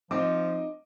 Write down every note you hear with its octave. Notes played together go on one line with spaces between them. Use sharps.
F3 C4 D#4 F4 D#5 D6